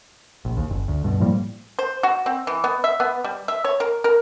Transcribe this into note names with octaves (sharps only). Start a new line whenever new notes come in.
A#1
D#2
F#1
D2
G2 B2
A2 F3 G3 A#3
C5
F#4
C4
E3
B3
E5
B3
G3
E5
C#5
A#4
A#4